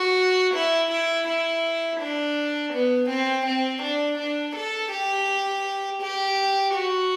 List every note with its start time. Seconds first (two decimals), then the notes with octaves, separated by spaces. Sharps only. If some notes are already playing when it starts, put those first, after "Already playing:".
Already playing: F#4
0.54 E4
0.91 E4
1.27 E4
2.00 D4
2.73 B3
3.09 C4
3.46 C4
3.82 D4
4.18 D4
4.56 A4
4.91 G4
6.02 G4
6.74 F#4